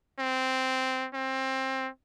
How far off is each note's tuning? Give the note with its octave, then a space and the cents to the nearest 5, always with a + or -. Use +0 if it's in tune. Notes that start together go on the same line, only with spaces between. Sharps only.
C4 -5
C4 +20